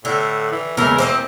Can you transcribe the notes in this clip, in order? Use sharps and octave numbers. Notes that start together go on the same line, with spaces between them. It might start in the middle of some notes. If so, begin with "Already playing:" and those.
A2 D3
E3
E2 C#3 E3 G#3 A#4
E3 A#3 C4 C5 D#5